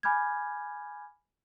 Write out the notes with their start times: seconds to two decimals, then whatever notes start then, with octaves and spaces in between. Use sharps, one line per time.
0.03 G#5 B5 D6 F6 G6 G#6